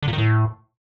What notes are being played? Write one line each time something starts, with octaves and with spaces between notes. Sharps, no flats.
D3
A#2
D#3
A2